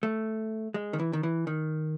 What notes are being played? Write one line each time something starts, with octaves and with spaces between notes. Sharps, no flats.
A3
G#3
D#3
E3
D#3
E3
D#3